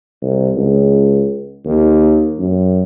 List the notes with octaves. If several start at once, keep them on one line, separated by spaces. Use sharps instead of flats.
C2
C#2
D#2
F#2